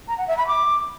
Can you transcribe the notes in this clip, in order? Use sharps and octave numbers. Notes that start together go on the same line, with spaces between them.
A#5
F#5
E5
B5
D6